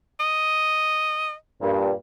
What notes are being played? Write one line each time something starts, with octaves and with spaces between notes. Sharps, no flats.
D#5
G2 A#2